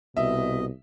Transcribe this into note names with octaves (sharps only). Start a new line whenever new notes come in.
C2 B2 D#5 E5